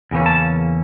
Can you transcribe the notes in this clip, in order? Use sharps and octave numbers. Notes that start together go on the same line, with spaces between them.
E2 C#3 E3 A#3 C#4
A5